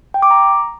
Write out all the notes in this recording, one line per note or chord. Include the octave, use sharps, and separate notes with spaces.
G5
D6
A#5